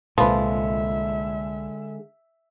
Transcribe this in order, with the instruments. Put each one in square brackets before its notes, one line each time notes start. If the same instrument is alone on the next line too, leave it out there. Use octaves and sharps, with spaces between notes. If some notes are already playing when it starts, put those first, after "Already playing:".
[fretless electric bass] C2 A#2 [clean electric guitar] D3 G#3 [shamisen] F3 B4 [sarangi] E5